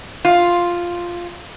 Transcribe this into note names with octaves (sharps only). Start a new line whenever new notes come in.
F4